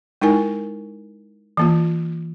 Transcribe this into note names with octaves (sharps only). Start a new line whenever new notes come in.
G#3 D#4 E4 A#4 G#5
E3 A#3 F4